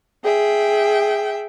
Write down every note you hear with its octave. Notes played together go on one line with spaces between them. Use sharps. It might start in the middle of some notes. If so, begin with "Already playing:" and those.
G#4 E5 G5